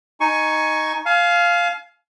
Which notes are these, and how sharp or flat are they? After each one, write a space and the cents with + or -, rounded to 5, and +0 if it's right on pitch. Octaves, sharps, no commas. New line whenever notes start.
D#4 +0 G#5 +15 C#6 +0
F5 +0 G#5 +40